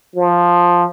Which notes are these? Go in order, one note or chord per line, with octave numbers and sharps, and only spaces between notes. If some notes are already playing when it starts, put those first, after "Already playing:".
F3